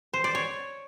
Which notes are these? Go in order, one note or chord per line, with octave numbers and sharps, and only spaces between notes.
C5
D5
C#5